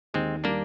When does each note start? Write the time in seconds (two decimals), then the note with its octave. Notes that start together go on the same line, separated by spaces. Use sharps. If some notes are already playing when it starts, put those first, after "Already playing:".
0.14 D#2 G#3 C4
0.44 G3 A#3 D4